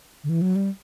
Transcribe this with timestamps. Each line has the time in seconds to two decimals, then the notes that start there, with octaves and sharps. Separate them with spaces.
0.24 D3
0.29 E3
0.42 F#3
0.55 G3